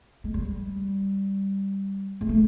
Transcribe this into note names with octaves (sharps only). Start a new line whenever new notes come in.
G#3
G3
G#3
A3